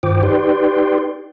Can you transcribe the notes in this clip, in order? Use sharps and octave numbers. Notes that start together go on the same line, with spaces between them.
G2 D#3 F4 C5 G5 D6
D#4 G4 B4 D5 G5 C6